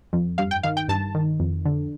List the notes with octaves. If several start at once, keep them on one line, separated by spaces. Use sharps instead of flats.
F2
G2 F5
G5
D#3 F5
G5
G2 A5
D#3
F2
D3